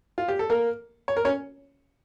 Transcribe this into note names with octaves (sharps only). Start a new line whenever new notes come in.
F4
G4
A4
A#3 A#4
C#5
A#4
C#4 C#5